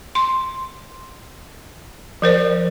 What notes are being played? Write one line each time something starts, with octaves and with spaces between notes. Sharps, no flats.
C6
F3 A#4 C5 D5